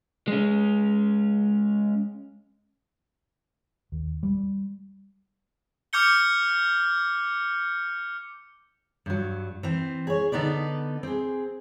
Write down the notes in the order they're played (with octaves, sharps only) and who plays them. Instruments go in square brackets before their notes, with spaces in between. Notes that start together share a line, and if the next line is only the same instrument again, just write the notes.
[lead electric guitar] G#3 C#4
[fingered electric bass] D#2
G3
[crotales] D6 F6 G6 C#7 G7
[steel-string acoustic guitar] G2 F#3
E3 C4
G#4 C#5
D3 B3 D#4 B4 D5
C4 G#4